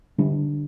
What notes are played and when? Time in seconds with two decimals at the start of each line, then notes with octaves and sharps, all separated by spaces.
0.18 D3 G3 D4